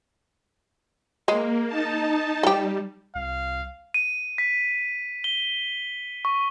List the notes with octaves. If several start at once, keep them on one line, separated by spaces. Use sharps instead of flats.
G#3 A#3
D#4 A5
G3 G4 A4
C2 F5
D#7
B6
G7
C#6